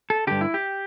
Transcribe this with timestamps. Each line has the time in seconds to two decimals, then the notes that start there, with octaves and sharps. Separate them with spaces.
0.10 A4
0.27 G2 D3 G4
0.41 E4
0.54 G4